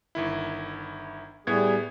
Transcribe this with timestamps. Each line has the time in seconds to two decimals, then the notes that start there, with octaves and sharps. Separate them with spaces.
0.15 G1 D#3 E4
1.47 A2 G3 B3 G#4 G#6